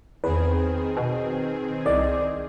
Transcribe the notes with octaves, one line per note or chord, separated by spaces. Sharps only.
E2 D#3 C4 G#4 B4
B2
C2 D5 D#5